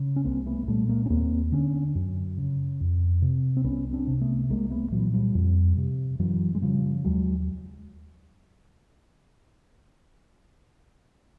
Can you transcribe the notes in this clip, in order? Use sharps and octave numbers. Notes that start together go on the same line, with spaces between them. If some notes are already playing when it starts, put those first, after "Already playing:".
Already playing: C#3
C#4
C2 A#3 C4
A3 B3
A#2 G3 A3
G#3 A#3
C#4
D#2 A#3 C4
D3 B3 C#4
F#2
C#3
F2
C3
C4
C2 B3 C#4
C4 D4
C3
A3 B3
C2 G#3 A#3
A3 B3
A#2 E3 F#3
F3 G3
F2
C3
F#2 E3 F#3
G#3
C#3 F3 G3
D#2 F#3 G#3